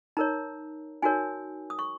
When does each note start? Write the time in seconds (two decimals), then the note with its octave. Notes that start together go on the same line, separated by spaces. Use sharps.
0.17 D#4 A#4 C#5 A#5
1.02 D#4 F#4 A#4 C#5 G#5
1.70 D#6
1.79 C#6